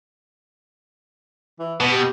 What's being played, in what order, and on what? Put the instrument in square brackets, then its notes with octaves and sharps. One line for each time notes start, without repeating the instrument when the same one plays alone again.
[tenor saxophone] E3
[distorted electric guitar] B2 [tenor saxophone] B4
[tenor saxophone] G4